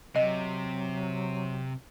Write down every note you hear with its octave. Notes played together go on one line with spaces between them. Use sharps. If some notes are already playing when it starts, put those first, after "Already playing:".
C3 F#3 D#5